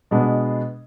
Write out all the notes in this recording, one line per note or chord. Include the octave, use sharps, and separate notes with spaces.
B2 G#3 B3 D4